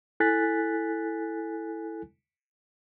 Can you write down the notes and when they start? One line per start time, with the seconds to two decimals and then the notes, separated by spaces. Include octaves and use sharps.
0.20 E4 A4 G#5 F#6 A6 B6